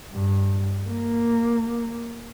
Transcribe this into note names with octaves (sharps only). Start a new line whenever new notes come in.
G2
A#3